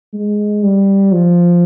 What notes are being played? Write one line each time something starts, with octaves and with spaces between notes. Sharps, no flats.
G#3
G3
F3